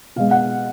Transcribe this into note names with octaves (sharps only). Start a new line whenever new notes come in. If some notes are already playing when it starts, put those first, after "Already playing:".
B2 G#3 F5
F#5